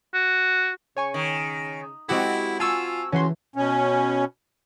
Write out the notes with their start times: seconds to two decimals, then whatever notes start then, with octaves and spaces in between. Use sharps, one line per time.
0.14 F#4
0.96 C#3 C#5 G#5 C#6
1.14 D#3
2.09 G#3 C4 E4 F#4 G4 A4
2.60 F4 G#5 A5 C#6 E6
3.12 C#2 E3 C#4 F#4 C6
3.56 B2 C#4